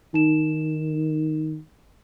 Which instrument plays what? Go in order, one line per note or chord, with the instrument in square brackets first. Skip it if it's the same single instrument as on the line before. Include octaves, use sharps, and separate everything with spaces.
[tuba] D#3 [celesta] D#4 E7